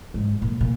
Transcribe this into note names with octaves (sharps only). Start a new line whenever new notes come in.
G#2
A#2
A#2